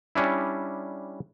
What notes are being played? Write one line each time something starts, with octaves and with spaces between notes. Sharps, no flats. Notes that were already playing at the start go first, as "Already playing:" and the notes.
G3 C#4 D4 E4